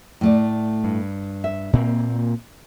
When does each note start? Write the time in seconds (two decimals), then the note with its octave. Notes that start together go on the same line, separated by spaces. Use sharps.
0.21 A2 A3 D5
0.84 G2
1.44 E5
1.73 A#2 A#3 C4